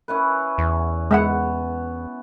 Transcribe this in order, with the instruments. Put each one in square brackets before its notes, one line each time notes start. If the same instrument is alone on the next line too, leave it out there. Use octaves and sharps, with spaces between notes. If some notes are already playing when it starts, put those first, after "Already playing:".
[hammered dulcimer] C#4 E4 B4
[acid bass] E2
[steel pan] G#3 E5 F#5 [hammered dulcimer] B3